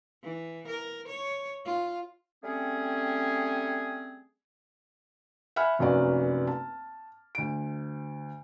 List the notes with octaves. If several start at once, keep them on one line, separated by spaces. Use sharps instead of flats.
E3
A#4
C#5
F4
G3 A3 C4 C#4 G#4
E5 F#5 G#5 B5 F6
F1 F#2 A#3 F#4 B4 D5
A5
D2 D7